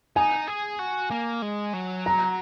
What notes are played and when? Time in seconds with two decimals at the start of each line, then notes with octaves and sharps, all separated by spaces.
0.16 D#4 G#5
0.48 G#4
0.79 F#4
1.10 A#3
1.42 G#3
1.74 F#3
2.06 A#5